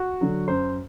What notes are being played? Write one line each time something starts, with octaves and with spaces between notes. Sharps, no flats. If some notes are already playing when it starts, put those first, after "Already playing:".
Already playing: F#4
D3 F#3
F#2 C5